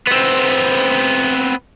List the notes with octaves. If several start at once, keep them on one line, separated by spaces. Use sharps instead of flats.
B3 C4